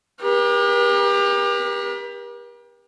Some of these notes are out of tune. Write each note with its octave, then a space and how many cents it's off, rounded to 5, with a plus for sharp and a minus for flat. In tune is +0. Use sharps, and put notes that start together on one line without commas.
G4 +30 A#4 +45